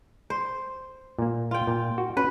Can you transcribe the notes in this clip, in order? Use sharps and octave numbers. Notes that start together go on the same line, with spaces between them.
C5
A#2 A#3
F4 G5
A#2
F#4
C#4 F#4 B4